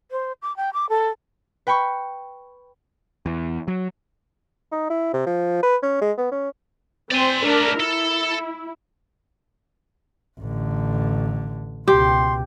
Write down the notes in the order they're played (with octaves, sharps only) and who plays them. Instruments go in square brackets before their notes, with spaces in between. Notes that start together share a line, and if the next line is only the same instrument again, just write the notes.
[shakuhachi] C5
D6
G5
D6
A4
[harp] B4 G5 B5 C#6
[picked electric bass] E2
F#3
[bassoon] D#4
E4
C3
F3
B4
C#4
G#3
B3
C#4
[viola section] C4 C5 [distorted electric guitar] D5 G#5
[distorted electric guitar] A3 B3 [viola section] D4 A#4
[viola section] E4 [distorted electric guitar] A4
[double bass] A1 D3
[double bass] C#2 B2 [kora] G4 [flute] C6